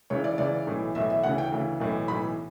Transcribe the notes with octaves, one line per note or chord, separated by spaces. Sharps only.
C#2 C#3 E3 C#5
D5
C#2 C#3 E3 D5
B1 A2 E3
B1 A2 E3 E5
E5
D2 C#3 E3 F#5
G5
D2 C#3 E3
B1 A2 E3
B1 A2 E3 B5